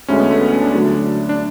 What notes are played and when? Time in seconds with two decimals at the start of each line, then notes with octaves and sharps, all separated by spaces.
0.08 D2 D3 G#3 C#4
0.20 B3
0.31 A3
0.41 B3
0.52 C#4
0.63 D4
0.74 D2 D3 F#3 A3
1.29 D4